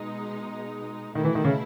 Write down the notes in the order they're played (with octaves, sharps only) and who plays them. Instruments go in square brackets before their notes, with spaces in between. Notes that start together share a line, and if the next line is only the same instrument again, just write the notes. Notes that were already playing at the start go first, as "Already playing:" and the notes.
Already playing: [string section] B2 G#3 D#4
[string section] B2 A3 E4 [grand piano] D#3
[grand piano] E3
D#3
C#3